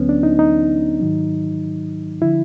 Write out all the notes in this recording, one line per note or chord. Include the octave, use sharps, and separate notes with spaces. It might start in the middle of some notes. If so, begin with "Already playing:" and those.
Already playing: D2 D3 F#3 B3 C#4
D4
D#4
D#4
G#2 D#3 F#3
D3 F3 E4